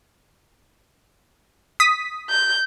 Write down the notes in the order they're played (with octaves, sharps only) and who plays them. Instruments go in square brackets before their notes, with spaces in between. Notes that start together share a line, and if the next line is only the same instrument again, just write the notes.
[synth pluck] D#6 B6
[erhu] G6